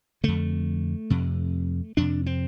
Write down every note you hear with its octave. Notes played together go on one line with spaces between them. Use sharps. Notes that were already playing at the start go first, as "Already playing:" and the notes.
F2 D3 A3
F2 C3
F2 C3 D4
C4